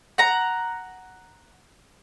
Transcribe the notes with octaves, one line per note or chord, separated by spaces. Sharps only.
F#5 A#5